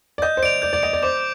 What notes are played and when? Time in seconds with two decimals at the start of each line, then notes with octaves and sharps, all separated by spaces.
0.18 D5
0.22 D#5 G6
0.37 C5
0.43 D5 D7 F7
0.62 D5 G6
0.73 D5
0.83 D#5 D7 F7
0.93 D5
1.03 C5 D6